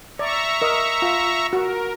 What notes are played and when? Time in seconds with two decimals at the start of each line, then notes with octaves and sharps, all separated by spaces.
0.19 D5 E5 A#5 C#6
0.62 A#4 D#5
1.02 F4
1.53 F#4 A#4